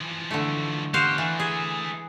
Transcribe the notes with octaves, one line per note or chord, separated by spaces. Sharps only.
E3 F3
D3 A3
E2 F#4 G4 C5 F5
D3 E3 A3
G#4